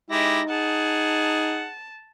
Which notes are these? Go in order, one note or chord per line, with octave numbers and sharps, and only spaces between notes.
G#3 D#4 E4 G4 A#6
G#4 F#5 A5